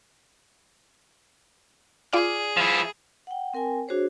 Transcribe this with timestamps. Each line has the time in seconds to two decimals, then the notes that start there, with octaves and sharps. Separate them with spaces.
2.13 F4 G#4 D5 F6
2.57 F3 E4
3.27 F#5 G5
3.54 C4 A#4 G5 G#5
3.88 D4 F#4 G#4 C5 C#5